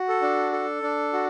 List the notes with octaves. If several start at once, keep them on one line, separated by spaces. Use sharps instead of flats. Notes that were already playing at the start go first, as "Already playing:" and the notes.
Already playing: F#4
A4
D4
A4
D4
F#4